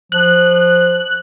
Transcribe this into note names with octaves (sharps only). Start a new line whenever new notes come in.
F3 F#6